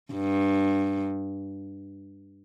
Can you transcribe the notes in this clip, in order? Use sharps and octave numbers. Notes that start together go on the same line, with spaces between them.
G2